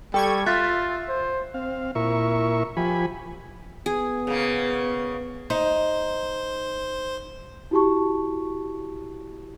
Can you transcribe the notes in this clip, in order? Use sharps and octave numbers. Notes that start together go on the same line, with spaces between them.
G3 A4 G5 C#6 G#6
F4 E5 F#6 A6
C5
C4 F5
A#2 E4 A#4 E5 C#6
F3 G4 G#5 B5
B3 G#4
C#3 A#3
D#4 C5
E4 F#4 G4 A5 C#6